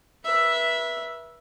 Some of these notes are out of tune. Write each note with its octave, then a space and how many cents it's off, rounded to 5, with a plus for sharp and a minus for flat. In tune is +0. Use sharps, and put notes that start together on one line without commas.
B4 -35 E5 +0